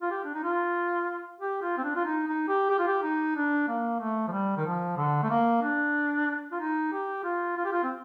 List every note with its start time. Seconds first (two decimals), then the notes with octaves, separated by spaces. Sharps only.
0.02 F4
0.11 G4
0.25 D4
0.34 D#4
0.44 F4
1.41 G4
1.62 F4
1.78 C4
1.84 D4
1.96 F4
2.05 D#4
2.28 D#4
2.49 G4
2.70 G4
2.79 F4
2.88 G4
3.03 D#4
3.36 D4
3.68 A#3
4.00 A3
4.28 F3
4.32 G3
4.57 D#3
4.66 F3
4.97 D3
5.23 A3
5.30 A#3
5.62 D4
6.52 F4
6.60 D#4
6.93 G4
7.24 F4
7.57 F4
7.65 G4
7.73 F4
7.83 C4